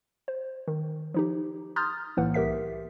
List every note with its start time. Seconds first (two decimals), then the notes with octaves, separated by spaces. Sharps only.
0.28 C5
0.68 D#3
1.14 F3 D#4 G4
1.76 A#5 C6 D#6 F6 G6 A6
2.17 B1 A2 E3 A#3 B4 F#5
2.34 C2 G4 A#4 E5 B6